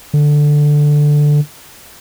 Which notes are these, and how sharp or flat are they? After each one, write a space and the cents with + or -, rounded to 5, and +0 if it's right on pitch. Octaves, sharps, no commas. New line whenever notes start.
D3 +5